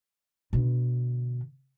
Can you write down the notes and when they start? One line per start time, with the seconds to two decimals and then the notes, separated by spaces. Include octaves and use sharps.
0.53 B2 D3